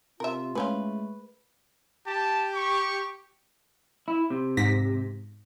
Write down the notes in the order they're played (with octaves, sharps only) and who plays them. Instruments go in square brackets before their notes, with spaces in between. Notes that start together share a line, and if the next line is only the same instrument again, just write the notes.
[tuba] C3 [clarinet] F4 [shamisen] A#4 E5
[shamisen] E3 C#4 F4 [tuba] G#3 [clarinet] A3 [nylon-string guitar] B4
[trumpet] G4 [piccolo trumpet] A5
[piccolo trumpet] C#6
[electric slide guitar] E4
C3
[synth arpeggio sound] G#2 A#6 B6